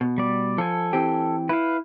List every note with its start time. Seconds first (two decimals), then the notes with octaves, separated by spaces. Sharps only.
0.01 B2
0.18 G3 D5
0.58 F3 A4 G#5
0.93 E3 C4 G4
1.49 E4 B4 F5